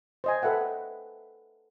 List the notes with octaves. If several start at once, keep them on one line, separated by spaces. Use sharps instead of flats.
C5 D#5 G#5
A4 B4 E5 F#5 G5